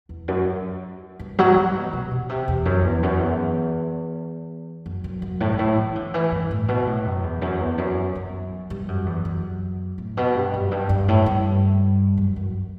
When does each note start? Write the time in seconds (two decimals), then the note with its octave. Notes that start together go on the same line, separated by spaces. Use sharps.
0.09 E2
0.28 F#2
1.19 G2
1.39 F#3
1.56 E3
1.75 B2
1.93 B2
2.11 B2
2.29 C3
2.48 E2
2.65 F#2
2.84 E2
3.03 F#2
3.20 E2
4.86 F#2
5.04 F#2
5.22 F#2
5.41 A2
5.53 G2
5.59 A2
5.77 E3
5.96 D3
6.14 E3
6.32 G2
6.51 A2
6.68 B2
6.87 A2
7.06 F#2
7.23 E2
7.42 F#2
7.60 E2
7.78 F#2
8.15 F#2
8.70 G2
8.88 F#2
9.06 E2
9.25 F#2
9.98 A2
10.17 B2
10.36 G2
10.54 F#2
10.71 G2
10.89 G2
11.08 A2
11.26 G2
12.17 F#2
12.36 F#2